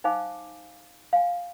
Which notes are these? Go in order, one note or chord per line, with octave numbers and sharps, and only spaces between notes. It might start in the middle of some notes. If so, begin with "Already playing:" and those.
D#4 C5 F5 G#5 D6
F5 G#5